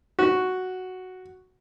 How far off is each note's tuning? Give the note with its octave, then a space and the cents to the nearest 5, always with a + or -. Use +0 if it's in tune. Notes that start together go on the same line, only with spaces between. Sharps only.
F#4 +0